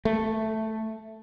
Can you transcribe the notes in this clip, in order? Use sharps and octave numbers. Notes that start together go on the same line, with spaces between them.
A3